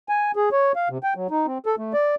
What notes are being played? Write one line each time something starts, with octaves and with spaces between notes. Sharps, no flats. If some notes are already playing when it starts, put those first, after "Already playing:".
G#5
G#4
C#5
F5
C3
G5
F#3
D#4
C4
A4
A3
D5